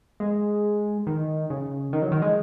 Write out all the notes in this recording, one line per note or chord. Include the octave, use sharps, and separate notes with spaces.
G#3
D#3
C#3
D#3
F#3
D#3
G#3